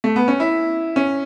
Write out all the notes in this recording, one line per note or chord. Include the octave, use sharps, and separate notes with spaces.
A3
B3
C#4
E4
C#4